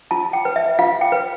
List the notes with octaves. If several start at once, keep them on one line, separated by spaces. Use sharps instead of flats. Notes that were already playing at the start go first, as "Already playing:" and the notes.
F4 A5
G5
B4
E5
F4 F5
G5
B4